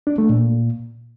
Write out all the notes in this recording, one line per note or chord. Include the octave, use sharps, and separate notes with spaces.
D4
A3
A#2